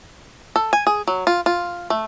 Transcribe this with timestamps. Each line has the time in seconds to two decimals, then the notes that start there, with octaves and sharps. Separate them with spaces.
0.56 A4
0.73 G#5
0.87 G#4
1.07 F#3
1.27 F4
1.46 F4
1.90 A3